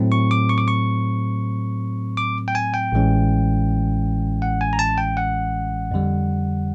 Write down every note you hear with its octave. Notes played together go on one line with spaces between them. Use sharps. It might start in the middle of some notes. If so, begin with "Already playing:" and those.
Already playing: A2 F#3 A3 C4
C#6
D6
C#6
D6
C#6
D6
G5
G#5
G5
A1 A2 E3 G#3 C#4
F#5
G#5
A#5
A5
G5
F#5
F2 D3 G3